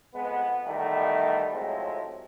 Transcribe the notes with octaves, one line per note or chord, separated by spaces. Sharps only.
F2 G#3 B3
B2 D#3 E3 G3 A3
A2 C3 F3 F#3 G#3